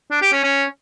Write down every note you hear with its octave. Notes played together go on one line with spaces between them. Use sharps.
D4
G4
C#4
C#4